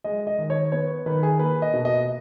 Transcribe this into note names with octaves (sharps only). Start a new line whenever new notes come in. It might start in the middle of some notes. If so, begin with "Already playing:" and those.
G#3 D#5
D#5
D#3
C#5
B3 C#5
D#3 B4
G#4
A#3 B4
D#5
B2
D#5